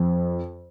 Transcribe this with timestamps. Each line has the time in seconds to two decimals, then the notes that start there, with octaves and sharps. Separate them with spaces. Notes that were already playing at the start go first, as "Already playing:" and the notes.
Already playing: F2